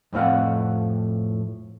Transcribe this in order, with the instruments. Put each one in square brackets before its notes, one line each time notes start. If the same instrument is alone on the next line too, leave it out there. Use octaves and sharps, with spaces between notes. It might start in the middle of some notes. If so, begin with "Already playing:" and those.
[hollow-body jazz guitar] F2 A2 C4 F5 F#5